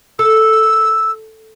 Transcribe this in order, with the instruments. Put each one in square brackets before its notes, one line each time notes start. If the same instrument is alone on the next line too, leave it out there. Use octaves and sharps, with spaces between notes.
[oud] A4 [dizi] E6